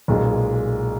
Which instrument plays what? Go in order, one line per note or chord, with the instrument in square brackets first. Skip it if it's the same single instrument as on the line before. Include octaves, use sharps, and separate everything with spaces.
[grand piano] B1 A#2 G#3